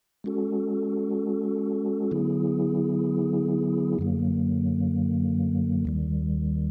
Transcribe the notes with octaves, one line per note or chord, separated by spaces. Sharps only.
G#3 C#4 F#4 A4
D3 F#3 B3 E4 G#4
F#2 D3 F#3 A#3
D#2 D#3 G3